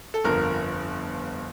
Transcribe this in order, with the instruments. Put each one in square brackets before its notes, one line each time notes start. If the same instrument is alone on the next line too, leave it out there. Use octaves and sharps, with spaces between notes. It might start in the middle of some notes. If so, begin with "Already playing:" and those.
[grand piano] A4
G1 F2 D3 A#4